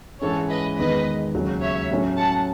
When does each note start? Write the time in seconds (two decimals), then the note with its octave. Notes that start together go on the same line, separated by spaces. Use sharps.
0.21 G#2 E3 G#3 C#4 A4 C#5
0.50 B4 D#5
0.77 E2 D#3 G#3 B3 B4 D#5
1.35 D#2 C#3 F#3
1.62 C#5 E5
1.91 A2 F#3 C#4
2.18 F#5 A5